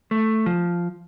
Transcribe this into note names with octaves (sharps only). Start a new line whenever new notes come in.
A3
F3